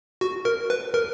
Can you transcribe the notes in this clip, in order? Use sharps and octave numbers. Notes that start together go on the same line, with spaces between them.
F#4
A#4
B4
A#4